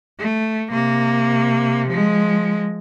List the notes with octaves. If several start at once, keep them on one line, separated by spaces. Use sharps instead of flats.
A3
C3 A#3
F3 G#3